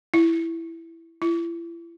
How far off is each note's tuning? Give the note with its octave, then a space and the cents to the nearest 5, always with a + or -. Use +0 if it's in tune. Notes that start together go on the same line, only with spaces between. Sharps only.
E4 +5
E4 +40